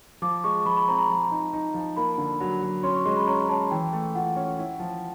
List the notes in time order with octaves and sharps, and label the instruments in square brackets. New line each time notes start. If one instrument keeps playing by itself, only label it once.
[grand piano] F3 [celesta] D6
[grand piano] G#3 [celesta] C#6
[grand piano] F3 [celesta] B5
[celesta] B5
[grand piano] C4 [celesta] A#5
[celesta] A#5
[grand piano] F3
D#4
D#4
F3
[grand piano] A#3 [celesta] B5
[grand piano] D3
F#3
F#3
[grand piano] C#4 [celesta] C6
[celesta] C#6
[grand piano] G#3 [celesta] C6
[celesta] B5
[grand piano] C#4 [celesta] A#5
[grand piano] C#4 [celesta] A5
[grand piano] E3 [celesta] G5
[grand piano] A3
[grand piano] F4 [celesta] F#5
[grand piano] C#4
E4
F3